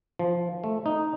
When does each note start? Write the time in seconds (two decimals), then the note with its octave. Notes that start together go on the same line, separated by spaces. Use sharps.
0.19 F3
0.64 A3
0.86 D#4